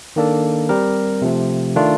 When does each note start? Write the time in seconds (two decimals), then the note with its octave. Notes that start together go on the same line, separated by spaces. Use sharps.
0.16 D#3 A#3 D4 A4
0.69 G3 C4 G4 A#4
1.22 C3 F3 A3
1.76 D#3 A3 D4 F4